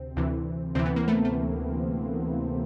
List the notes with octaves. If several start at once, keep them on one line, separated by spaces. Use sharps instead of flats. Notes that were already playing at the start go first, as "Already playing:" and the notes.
Already playing: D2 C3 C4
D2 C3 E3
D2 C3 E3 C4
B3
A#3
A3 B3
A3